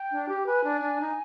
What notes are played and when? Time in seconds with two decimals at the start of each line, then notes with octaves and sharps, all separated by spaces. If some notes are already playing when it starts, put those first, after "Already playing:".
Already playing: G5
0.11 D4
0.29 G4
0.46 B4 G#5
0.64 D4
0.81 D4
0.99 D#4